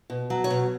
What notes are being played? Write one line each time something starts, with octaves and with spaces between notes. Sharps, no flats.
B2
F#3
C#5
B2